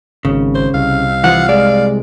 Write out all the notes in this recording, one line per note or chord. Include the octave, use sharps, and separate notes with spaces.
G#1 C#3
C5
C2 F5
E3 F3 F#5
G#3 D5